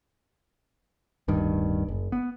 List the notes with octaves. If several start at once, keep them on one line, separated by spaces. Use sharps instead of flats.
D1 G2 D#3
F#1
B3